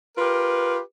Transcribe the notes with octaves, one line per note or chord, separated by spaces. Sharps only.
F4 G4 A#4 B4